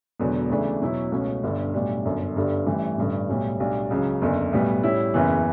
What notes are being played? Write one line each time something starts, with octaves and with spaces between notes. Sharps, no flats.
E1 E2 D3 F#3 B3
D2 C#3 E3 A3 D4
E2 B2 F#3 C#4 E4
C#2 B2 A3 C#4
G1 G2 D3
B1 A2 G3 D4
G1 F#2 D3
G1 G2 D3 G3
A1 A2 E3 G3
A1 G2 D3
B1 A2 G3 C#4
B1 A2 G3 D4
C#2 C#3 F#3
F#1 E2 D3
B1 A2 G3 B3
A2 G3 C#4 E4
F#1 E2 C#3 E3 B3